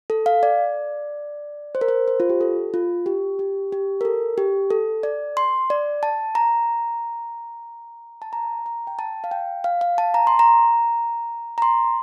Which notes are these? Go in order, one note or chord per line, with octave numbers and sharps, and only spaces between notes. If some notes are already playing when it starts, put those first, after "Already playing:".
A4
F5
D5
C5
A#4
C5
C5
F4
G4
A4
F4
G4
G4
G4
A#4
A4
G4
A4
D5
C6
D5
A5
A#5
A5
A#5
A#5
G5
A5
F5
G5
F5
F5
A5
A#5
C6
A#5
A#5
C6